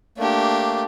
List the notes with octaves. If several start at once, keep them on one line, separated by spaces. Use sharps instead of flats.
A3 A#3 D4 G4